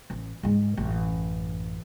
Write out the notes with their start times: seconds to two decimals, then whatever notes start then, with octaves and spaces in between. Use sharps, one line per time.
0.10 A1
0.43 G#2 G#3
0.77 A1 F#2